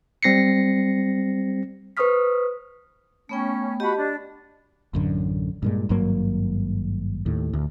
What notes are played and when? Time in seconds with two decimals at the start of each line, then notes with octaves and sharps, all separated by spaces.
0.23 G3 C4 A#6 C7 C#7
1.97 B4 C5 C#6 D#6 F6 B6
3.29 A3 B3 C#4 G5
3.80 F#4 G4 D#5 A5 B5
3.96 D4
4.94 A1 F#2 D3
5.63 G2 A#2 G#3
5.89 G#1 G2 F#3 A#3
7.26 D#2 A2
7.53 D2